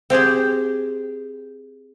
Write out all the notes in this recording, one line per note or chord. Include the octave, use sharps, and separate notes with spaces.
C4 G4 G#4 C5